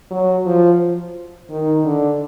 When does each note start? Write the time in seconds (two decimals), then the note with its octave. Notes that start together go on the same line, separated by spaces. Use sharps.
0.11 F#3
0.46 F3
1.50 D#3
1.85 D3